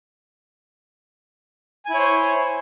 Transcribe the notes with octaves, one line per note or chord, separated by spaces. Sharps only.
E4 C5 C#5 G#5